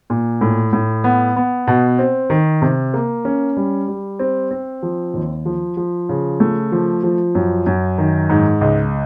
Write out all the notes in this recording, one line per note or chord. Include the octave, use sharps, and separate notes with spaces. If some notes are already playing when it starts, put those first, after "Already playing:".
A#2
A2
A2
B3
B3
B2
C4
D#3
C3
A#3
C#4
G3
G3
C4
C4
F3
D#2
F3
F3
C#3
A3
F3
F3
F#2
F#2
D#3
G#2
C#2